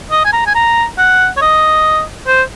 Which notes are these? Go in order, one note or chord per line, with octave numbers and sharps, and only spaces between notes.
D#5
G#5
A#5
G#5
A#5
F#5
C#5
D#5
C5